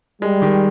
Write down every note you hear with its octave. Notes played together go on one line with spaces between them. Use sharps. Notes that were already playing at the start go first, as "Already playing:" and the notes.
G3 G#3
D#3